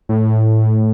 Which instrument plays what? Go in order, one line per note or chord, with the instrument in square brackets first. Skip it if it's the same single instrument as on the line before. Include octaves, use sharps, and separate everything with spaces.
[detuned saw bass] A2